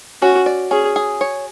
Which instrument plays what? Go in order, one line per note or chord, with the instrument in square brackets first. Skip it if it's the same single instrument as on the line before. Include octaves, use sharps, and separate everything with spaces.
[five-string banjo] C#4 [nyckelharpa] F#4
[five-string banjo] D5
[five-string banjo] C#4 [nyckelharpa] G#4
[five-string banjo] G#4
C#5